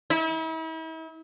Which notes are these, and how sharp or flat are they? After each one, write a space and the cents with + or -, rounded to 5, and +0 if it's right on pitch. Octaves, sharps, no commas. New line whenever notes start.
E4 -40